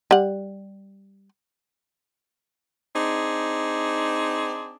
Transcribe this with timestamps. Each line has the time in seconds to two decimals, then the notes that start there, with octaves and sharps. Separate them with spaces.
0.11 G3 F#5
2.96 C4 D4 D#4 G#4